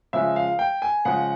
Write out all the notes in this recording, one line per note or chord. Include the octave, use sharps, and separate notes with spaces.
C#3 F3 G#3 E5
F5
G5
G#5
C#3 F3 G#3 F#5